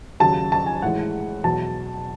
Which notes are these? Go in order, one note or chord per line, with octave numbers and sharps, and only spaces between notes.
D#2 C#3 F#3 A5
A5
G#5
A2 E3 G#3 F#5
E2 B2 F#3 A5